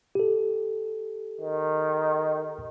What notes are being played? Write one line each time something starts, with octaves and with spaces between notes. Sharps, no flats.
G4 A4
D#3